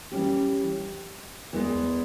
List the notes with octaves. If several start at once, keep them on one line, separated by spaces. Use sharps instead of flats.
E3 G3 C#4 G4
E2 E3 G#3